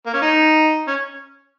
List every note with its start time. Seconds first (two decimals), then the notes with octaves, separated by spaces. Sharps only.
0.06 A#3
0.14 C#4
0.22 D#4
0.88 C#4